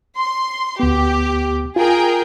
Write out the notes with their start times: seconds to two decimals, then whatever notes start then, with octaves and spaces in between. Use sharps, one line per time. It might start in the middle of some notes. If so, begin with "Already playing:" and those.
0.17 C6
0.80 D2 B3 G4
1.76 F4 G#4 A#4 G5